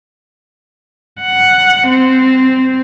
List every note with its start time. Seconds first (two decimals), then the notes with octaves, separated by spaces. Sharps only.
1.20 F#5
1.88 C4